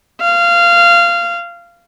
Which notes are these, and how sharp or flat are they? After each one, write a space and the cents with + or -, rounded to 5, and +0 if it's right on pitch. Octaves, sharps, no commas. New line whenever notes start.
F5 -20